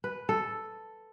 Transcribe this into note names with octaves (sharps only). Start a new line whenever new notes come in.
B4
A4